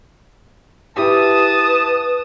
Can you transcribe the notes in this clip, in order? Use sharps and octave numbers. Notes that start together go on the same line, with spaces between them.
E4 G4 B4 A5 D#6